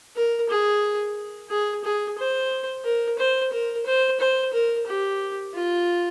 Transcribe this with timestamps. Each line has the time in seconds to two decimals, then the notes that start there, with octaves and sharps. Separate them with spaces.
0.16 A#4
0.50 G#4
1.50 G#4
1.84 G#4
2.18 C5
2.84 A#4
3.19 C5
3.53 A#4
3.86 C5
4.20 C5
4.53 A#4
4.86 G4
5.54 F4